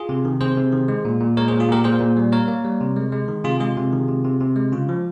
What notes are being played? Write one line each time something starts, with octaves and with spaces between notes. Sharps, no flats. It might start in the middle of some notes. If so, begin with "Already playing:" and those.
Already playing: F4 G#4
C3
D#3
C3 G#4 C5
C3
D#3
G#3
A#2
A#2
G#3 A#4 C#5
G#4 C5
A#2
F4 G#4
A#2 G4 A#4
A#2 G#4 C5
A#2
G3
A#3 A#4 C#5
A#3
G3
C3
G#3
G#3
D#3
C3 F4 G#4
G#3 F4 G#4
C3
D#3
C3
C3
C3
G#3
C#3 F4
F3